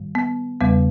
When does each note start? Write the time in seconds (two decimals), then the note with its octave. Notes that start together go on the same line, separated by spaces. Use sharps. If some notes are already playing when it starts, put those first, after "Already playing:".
Already playing: G#2 D#3 G3
0.15 B3
0.61 E2 C#3 G3 B3